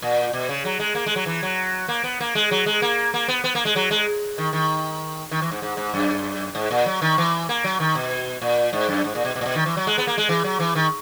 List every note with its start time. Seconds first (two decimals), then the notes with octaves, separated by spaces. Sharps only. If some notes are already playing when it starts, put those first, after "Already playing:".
0.02 A#2
0.33 B2
0.49 C#3
0.65 F#3
0.80 G#3
0.95 A#3
1.06 G#3
1.16 F#3
1.26 E3
1.43 F#3
1.88 A#3
2.04 B3
2.20 A#3
2.35 G#3
2.51 F#3
2.66 G#3
2.82 A#3
3.14 A#3
3.28 B3
3.44 B3
3.55 A#3
3.65 G#3
3.76 F#3
3.91 G#3
4.38 D#3
4.53 D#3
5.31 D#3
5.42 E3
5.51 G#2
5.62 G#2
5.77 G#2
5.94 F#2
6.55 G#2
6.71 A#2
6.86 F#3
7.02 D#3
7.18 E3
7.49 A#3
7.64 F#3
7.80 D#3
7.95 B2
8.42 A#2
8.73 G#2
8.89 F#2
9.04 G#2
9.15 A#2
9.25 B2
9.35 B2
9.41 A#2
9.46 B2
9.55 D#3
9.66 E3
9.77 F#3
9.87 G#3
9.98 B3
10.07 A#3
10.18 G#3
10.29 E3
10.44 F#3
10.60 E3
10.75 D#3